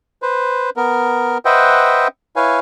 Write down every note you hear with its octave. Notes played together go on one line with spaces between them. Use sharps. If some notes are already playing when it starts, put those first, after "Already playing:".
B4 C5
B3 A#4
B4 C5 D#5 E5 F#5 G5
E4 B4 C#5 F5 G#5